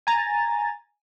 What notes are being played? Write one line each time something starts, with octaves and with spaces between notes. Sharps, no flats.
G#5 A#5 A6